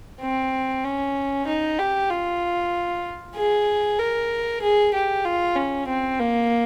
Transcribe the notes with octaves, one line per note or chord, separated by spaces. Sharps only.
C4
C#4
D#4
G4
F4
G#4
A#4
G#4
G4
F4
C#4
C4
A#3